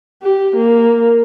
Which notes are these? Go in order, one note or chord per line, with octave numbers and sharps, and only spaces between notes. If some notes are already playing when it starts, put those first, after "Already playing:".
G4
A#3